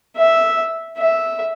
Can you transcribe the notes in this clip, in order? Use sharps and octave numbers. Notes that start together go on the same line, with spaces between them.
E5
E5